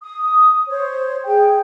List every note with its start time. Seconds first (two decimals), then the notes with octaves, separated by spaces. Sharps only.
0.03 D#6
0.69 C5 C#5
1.26 G#4 G5